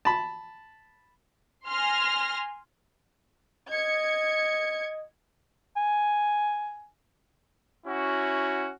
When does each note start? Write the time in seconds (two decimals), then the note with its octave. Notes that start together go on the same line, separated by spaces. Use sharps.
0.05 A5 B5
1.67 G#5 C6 F6 A#6
3.70 D#5 G#6 C#7
5.77 G#5
7.86 C#4 E4 F#4